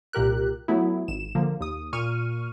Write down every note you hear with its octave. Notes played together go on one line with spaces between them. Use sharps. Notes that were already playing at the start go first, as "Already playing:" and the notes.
C2 A#2 G4 A#4 F#6
F#3 A3 B3 E4
G#1 E7
D3 F3 A#3
D#2 D#6
A#2 C#6 F6 D#7